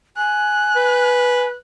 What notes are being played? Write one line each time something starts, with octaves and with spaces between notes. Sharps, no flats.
G#5 F#6
B4